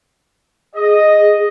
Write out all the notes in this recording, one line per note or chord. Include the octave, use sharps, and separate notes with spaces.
G#4 D#5